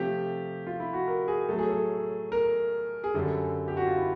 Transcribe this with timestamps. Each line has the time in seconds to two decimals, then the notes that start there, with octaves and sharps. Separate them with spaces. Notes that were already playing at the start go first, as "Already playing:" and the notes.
Already playing: C3 F3 A3 G4
0.67 F4
0.80 E4
0.93 F#4
1.08 A#4
1.28 G#4
1.49 A2 F#3 A3 A4
1.59 G#4
1.68 A4
2.32 A#4
3.04 G#4
3.14 F#2 D3 G3 A4
3.68 G4
3.77 F#4
3.87 F4
3.97 E4